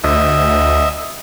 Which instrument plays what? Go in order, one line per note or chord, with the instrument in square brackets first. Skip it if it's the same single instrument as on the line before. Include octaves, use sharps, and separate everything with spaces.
[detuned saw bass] D2 [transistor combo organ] D#5 E5